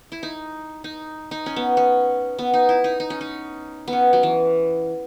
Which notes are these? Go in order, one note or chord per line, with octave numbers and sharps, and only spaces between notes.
E4
D#4
D#4
D#4
C#4
B3
C#4
B3
D#4
E4
D#4
D#4
C#4
D#4
B3
C#4
F#3
E3